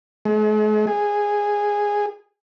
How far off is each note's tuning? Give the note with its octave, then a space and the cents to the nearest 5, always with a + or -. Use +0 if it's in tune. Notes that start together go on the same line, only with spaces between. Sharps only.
G#3 +45
G#4 -10